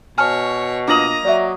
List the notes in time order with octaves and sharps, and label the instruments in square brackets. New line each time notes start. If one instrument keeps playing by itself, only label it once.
[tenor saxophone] B2 [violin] C#5 [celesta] G#5 A5 F6
[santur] A#3 D#5 D#6 [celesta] D4 F4 F#7 [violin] A#5
[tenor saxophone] F#3 [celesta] D5 E5